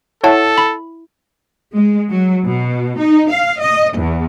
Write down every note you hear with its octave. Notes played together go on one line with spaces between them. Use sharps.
E4 A4 C#5 E5 F#5 A5
B5
G#3
F#3
B2
D#4
F5
D#5
E2